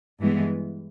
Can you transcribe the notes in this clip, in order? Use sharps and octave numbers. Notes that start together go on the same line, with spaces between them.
G2 E3 G#3 B3